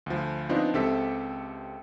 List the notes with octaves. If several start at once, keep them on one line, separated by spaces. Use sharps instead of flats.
D2 F3
F3 B3 C4 D4 D#4 F4
C#2 C4 G4 A4 E5 B6